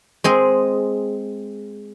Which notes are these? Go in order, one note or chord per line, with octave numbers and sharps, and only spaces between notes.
G#3 C4 G#4